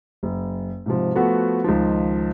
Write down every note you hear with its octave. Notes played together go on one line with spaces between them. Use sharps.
F#1
G#2 C3 F3
F3 A3 B3 F#4
C#2 D#3 F3